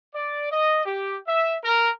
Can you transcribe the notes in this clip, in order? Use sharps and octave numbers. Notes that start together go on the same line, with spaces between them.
D5
D#5
G4
E5
A#4